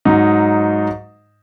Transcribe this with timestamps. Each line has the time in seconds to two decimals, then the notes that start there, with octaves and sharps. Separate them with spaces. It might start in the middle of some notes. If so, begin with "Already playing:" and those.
0.05 G#2 F#3 D#4